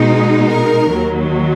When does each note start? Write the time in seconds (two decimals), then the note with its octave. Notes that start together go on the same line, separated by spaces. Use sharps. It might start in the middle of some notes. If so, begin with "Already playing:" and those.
Already playing: B2 G#3 D#4
0.49 A#4
0.89 D#2 D#3 F#3